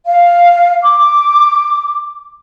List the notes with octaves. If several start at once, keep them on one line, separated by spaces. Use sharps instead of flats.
F5
D6